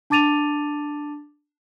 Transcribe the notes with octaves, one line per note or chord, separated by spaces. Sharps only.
D4 A5 D6 A6 D#7 F7